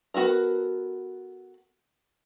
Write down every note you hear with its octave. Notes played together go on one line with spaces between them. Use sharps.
B3 F#4 A4 A#4